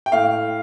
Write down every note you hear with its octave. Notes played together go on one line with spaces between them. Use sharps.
G5
A2 F5